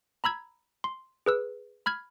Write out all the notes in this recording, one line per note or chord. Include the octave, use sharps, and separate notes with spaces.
A#5 B5 E6 G#6
C6
G#4 B4 E6
B5 F6 G#6